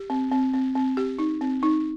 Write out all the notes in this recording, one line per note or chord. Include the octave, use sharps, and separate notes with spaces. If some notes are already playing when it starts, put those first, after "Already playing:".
Already playing: G4
C4
C4
C4
C4
G4
D#4
C4
D#4